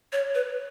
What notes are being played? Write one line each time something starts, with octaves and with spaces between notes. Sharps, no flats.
C#5
B4